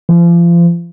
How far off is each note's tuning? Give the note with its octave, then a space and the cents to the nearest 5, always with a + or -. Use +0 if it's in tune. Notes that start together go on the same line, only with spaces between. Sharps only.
F3 -35